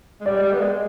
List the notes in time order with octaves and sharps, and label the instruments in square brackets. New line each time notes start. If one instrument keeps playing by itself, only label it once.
[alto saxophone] G#3
[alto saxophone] G3 [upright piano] D5
[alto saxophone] G3
B3
G#3